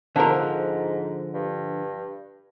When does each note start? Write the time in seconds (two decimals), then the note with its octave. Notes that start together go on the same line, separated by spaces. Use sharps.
0.16 G#2 D3 F3 A#4
1.34 G2